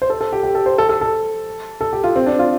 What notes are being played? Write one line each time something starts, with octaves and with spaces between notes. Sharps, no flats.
C5
A4
A4
G4
G4
A4
C5
A4
A4
A4
A4
G4
F4
C4
D4
F4